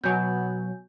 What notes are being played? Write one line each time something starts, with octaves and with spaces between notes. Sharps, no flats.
B2 F#3 B3 G#5 G6